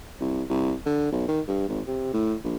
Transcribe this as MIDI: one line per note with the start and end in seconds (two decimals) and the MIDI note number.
0.20 0.43 36
0.49 0.73 36
0.86 1.11 50
1.12 1.24 35
1.28 1.40 51
1.48 1.65 43
1.68 1.81 32
1.87 2.09 48
2.13 2.35 45
2.44 2.56 34